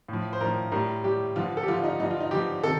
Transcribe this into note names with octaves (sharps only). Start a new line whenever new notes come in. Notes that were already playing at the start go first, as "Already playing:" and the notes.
A2 F3
C5
A2 F3 A#4
A2 G3 A#4
A2 G3 G4
G2 D3 F3 F4
A4
G4
G2 D3 F3 F4
D#4
G2 D3 F3 D#4
F4
D#4
G2 D3 F3 G4
C3 D#3 A4